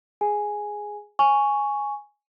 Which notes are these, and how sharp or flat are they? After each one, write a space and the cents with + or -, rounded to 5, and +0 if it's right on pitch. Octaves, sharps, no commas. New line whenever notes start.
G#4 +0 G#5 +0
G#5 +0 C#6 +5